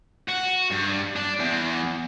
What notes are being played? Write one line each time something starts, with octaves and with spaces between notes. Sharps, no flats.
F#4
G2
D4
E2